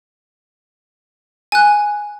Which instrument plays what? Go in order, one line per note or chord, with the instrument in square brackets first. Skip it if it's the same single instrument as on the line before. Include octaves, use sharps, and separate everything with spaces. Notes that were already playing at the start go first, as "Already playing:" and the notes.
[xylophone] G#5 F#6